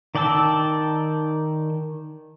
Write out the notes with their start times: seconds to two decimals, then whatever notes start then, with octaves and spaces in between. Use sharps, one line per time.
0.15 D#3 D5 G5 A5 E6